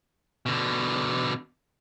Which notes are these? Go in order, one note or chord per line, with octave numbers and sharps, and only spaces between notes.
B2 D3